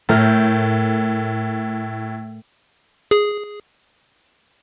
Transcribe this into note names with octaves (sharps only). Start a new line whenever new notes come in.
A2 A3 A#4 G6
G#4